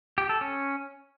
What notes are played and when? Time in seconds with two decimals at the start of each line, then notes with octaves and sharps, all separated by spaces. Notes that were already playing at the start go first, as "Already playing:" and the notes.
0.18 G4
0.29 A4
0.41 C#4